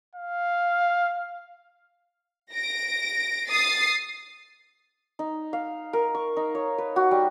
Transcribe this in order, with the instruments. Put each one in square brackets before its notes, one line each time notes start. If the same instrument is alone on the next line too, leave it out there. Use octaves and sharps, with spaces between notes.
[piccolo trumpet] F5
[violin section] A#6 D7
D#6 A6 C7
[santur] D#4
F5
A#4
C#6
D#4
C#5
B4
F#4
G3